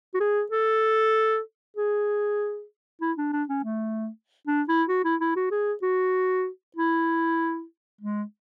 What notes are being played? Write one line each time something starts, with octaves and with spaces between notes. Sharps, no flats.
F#4
G#4
A4
G#4
E4
D4
D4
C#4
A3
D4
E4
F#4
E4
E4
F#4
G#4
F#4
E4
G#3